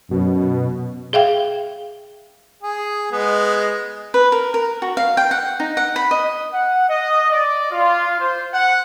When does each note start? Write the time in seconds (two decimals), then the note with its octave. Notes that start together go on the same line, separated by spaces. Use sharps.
0.11 F#2 B2
1.13 G#4 E5 F5 G5
2.63 G#4
3.12 G#3 B3
4.14 B4
4.32 A#4
4.54 A#4
4.82 F#4
4.97 F5
5.17 G5
5.31 F#5
5.60 D#4
5.77 F#5
5.96 B5
6.11 D#5
6.53 F#5
6.88 D#5
7.30 D5
7.71 F4
8.19 C5
8.52 F#5